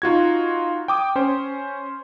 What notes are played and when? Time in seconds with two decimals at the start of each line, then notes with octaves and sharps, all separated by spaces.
0.02 D#4 F4 F#4 G#6
0.88 G5 D6 D#6
1.16 C#4 C5